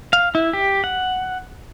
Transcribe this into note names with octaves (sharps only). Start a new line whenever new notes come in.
F5
E4
G4
F#5